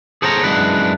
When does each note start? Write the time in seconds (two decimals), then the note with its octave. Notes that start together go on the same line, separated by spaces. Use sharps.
0.22 G#4 A4 C5 C#5 E5 A#5
0.44 F#2 G#3 D4 E4 B4